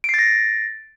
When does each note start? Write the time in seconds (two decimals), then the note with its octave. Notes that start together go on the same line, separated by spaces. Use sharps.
0.04 D7
0.09 C7
0.14 A6
0.19 A#6